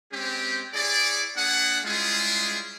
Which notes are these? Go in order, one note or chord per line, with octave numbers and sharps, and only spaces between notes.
G#3 C4 C#4 G4
E4 G#4 C#5 D5
A#3 D4 G#4 F#5
G3 G#3 C#4 E4 F4 G#4